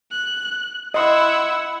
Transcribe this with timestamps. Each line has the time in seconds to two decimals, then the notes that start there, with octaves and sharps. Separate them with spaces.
0.12 F#6
0.94 E4 D#5 F#5 C6 E6